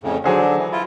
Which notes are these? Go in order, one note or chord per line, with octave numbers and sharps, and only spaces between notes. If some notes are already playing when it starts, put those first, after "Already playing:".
F2 A2 C#3
D3 F#3 D4 G#4 C5
E3
E4 F4